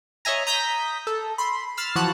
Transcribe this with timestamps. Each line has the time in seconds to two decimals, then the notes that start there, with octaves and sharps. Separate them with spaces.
0.25 C#5 D#5 E5 G#5 A#5
0.47 A#5 D#6 G6 A#6 B6
1.07 A4
1.38 B5 C6
1.77 B5 E6 F6 A6 C7
1.96 E3 F3 F#4 F#5 A5 F#6